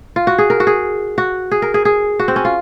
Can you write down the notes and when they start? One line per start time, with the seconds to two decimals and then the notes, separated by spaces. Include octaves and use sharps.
0.16 F4
0.27 F#4
0.38 G#4
0.50 A#4
0.60 F#4
0.67 G#4
1.18 F#4
1.51 G#4
1.62 A#4
1.74 G#4
1.85 G#4
2.19 F#4
2.28 C4
2.36 C#4
2.45 F4